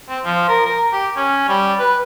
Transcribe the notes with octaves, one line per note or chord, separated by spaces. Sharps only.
C4
F3
A#4
A#4
G4
C#4
G3
B4